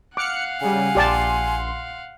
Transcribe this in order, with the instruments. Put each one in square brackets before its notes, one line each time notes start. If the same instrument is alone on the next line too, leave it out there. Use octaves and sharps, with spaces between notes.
[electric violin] F5 F#5 [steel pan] D6 [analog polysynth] F6 F#6 C#7
[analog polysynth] C#3 G3 [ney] G#5
[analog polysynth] A#1 C6 [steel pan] G4 D5 A5